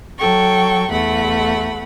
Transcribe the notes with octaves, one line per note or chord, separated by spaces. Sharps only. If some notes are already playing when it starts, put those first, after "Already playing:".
F#3 A4 G5 C#6
E2 A3 F#5 B5